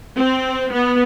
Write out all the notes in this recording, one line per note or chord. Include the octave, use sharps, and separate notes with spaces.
C4
B3